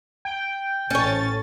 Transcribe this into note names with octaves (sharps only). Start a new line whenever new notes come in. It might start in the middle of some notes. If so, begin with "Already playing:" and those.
G5
A1 C#4 A4 C#5 A6